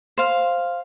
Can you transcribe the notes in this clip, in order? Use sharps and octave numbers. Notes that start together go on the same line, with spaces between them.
C5 F5